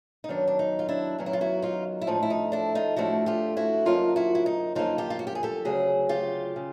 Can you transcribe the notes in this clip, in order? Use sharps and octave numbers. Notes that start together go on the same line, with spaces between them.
D#4
F#2 D#3 F#3 B3 D4
D4
D#4
F4
D4 E4
F#2 D#3 F#3 B3
E4
F4
E4 F#4
D#4 F4
E4
A2 F3 A3 D4 D#4
E4
D#4
D4 E4
D#4 F4
A2 F3 A3 D4 E4 F#4
F4 G4
E4 F#4
F#2 D3 F3 A#3 D#4 F4
E4 F#4
E4
D#4
F#2 D3 F3 A#3 D#4 F4
F4 G4
F4
F#4
G4
G#4
G4 A4
D2 C#3 F#3 F#4 G#4
F4 G4
C#3